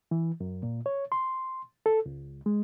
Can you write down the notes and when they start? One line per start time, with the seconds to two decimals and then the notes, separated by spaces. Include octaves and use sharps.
0.11 E3
0.40 F#2
0.63 A#2
0.86 C#5
1.12 C6
1.86 A4
2.06 C#2
2.46 G#3